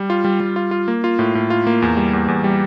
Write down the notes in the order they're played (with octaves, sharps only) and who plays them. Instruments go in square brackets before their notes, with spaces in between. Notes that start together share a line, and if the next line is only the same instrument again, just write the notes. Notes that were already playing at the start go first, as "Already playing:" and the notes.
Already playing: [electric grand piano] G3
F4
G3
G3
F4
F4
A#3
F4
A2
A2
F4
A#3
E2
G3
E2
E2
G3